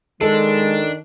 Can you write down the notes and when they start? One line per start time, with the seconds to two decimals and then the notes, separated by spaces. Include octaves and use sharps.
0.21 D#3 G#3 D4 A4